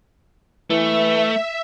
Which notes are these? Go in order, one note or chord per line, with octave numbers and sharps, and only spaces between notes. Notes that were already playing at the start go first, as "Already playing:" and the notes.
E3 A3 E5